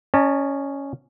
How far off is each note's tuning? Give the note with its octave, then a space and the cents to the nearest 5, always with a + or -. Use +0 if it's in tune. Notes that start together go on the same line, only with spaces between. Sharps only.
C#4 +0 D#5 -45 A5 +25